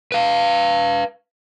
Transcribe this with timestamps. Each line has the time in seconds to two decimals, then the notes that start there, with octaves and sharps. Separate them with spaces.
0.12 B4 F5